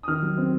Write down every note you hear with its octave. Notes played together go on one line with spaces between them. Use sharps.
D#6
D#3 F6
F#3
C4